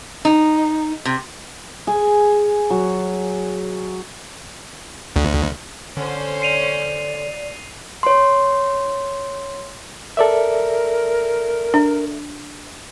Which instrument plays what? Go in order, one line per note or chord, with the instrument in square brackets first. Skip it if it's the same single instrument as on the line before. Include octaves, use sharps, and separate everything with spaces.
[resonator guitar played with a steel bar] D#4
C3
[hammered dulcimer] G#4
F#3
[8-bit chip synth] D2
[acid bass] D3 [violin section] C#4 C5
[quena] D5 [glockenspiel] C7 D#7 F7
[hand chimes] C#5 C6
[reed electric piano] A4 D5 E5 [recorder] A#4
[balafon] D4